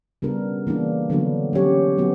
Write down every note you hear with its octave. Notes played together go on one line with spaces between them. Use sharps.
C#3 G3 B3 D4 A#4
E3 A#3 D4
D3 F#3 B3 D4 F#4
F#3 C#4 G4 C#5
F#3 B3 F#4